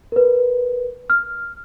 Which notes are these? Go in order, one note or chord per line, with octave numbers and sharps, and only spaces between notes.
A#4 B4
F6